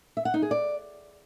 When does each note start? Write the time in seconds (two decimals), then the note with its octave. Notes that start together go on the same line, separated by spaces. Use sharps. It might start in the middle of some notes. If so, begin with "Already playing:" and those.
0.17 E5
0.25 F#5
0.34 D#4
0.42 G#4
0.51 D5